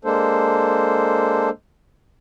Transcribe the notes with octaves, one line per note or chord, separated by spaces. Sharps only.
G#3 A#3 D4 A4 C5